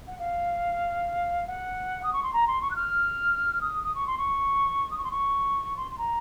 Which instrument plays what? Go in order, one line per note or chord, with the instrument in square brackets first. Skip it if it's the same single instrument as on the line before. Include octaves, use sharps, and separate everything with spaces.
[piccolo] F#5
F5
F#5
D#6
C#6
C6
A#5
C6
C#6
F#6
F6
D#6
D#6
C#6
C6
C#6
D#6
C#6
C6
C#6
C6
C6
A#5